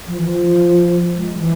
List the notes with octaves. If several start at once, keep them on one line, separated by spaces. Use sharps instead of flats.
F3
E3
F3
G#3
E3